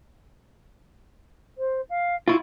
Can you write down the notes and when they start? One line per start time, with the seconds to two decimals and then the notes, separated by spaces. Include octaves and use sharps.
1.58 C5
1.89 F5
2.28 E4 F4 C#6